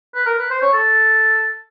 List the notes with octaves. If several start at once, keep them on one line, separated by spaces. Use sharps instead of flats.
B4
A#4
B4
C5
C#5
A4